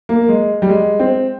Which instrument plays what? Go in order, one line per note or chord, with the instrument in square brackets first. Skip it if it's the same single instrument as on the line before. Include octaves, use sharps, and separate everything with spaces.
[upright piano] A#3
G#3
G3
G#3
C4